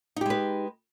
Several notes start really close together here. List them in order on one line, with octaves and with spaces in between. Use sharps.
D#4 G4 G#3 B4